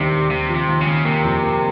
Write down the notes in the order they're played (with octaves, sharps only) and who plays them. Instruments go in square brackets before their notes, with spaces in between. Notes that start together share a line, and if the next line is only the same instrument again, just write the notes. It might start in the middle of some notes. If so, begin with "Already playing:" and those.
Already playing: [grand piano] D#2 D#3 G3 [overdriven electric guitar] C3
[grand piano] D#2
[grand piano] D#2 [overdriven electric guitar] C3
[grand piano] F3
[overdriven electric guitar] C3
[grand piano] D#2
[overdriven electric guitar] C#3
[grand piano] D#2
[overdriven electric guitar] C3 [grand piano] A#3
[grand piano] F2
A#3